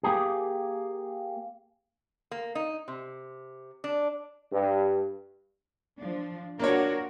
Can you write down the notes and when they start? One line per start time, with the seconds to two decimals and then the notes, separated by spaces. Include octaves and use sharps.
0.03 A#3 G4 G#4
2.31 A#3
2.55 D#4
2.88 C3
3.84 D4
4.52 G2
5.97 F3 D4
6.59 A#3 D4 F4 F#4 A#4 C#5